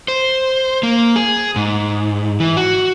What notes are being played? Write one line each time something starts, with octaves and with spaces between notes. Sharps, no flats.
C5
A#3
G#4
G#2
E3
F#4